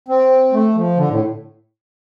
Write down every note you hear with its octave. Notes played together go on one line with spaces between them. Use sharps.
C4
A3
F3
D3
A2